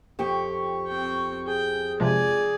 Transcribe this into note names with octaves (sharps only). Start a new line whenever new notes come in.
F2 G4 C#6
C4 G5
G#4 G5
C3 F3 G#3 D5 G#5